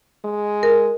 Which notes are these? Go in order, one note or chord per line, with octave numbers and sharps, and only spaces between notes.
G#3
A#4